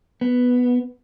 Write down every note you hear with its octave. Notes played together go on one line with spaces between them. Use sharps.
B3